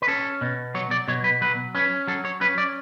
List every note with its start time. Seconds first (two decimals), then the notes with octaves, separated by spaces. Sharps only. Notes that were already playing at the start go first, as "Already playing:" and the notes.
0.02 B4
0.08 C#4 A4
0.41 B2
0.74 F#3 C#5
0.91 D5
1.08 B2 C#5
1.24 B4
1.41 F#3 B4
1.75 C#4 B4
2.07 F#3 A4
2.25 C#5
2.41 C#4 B4
2.58 D5